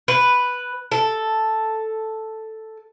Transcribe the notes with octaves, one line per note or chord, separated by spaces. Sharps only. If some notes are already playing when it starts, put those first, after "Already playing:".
B4
A4